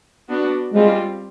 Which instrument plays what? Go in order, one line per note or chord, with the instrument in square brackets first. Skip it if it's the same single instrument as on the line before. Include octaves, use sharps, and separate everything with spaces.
[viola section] B3 D4 F#4
[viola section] G3 C4 F4 [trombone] G#3